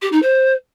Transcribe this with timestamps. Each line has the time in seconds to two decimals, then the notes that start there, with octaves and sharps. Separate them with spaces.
0.02 G4
0.12 D#4
0.22 C5